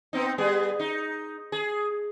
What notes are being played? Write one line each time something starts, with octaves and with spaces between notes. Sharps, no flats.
B3 C4 D#4
G3 B3 G#4
D#4
G#4